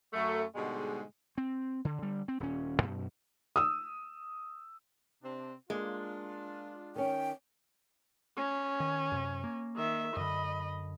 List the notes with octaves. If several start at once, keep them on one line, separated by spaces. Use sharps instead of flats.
F#2 A3
G#2 B2 D3 G3 G#3
C4
D3
D3 G3
C4
D#1 C#4
F#2 B2
D#6 E6
C3 C4 D4
G#3 A#3 D4 F4
D#3 C#4 G5
C#4
D#3
F#2 C3
A#3
D#3 E5
F#2 D3 D#5 B5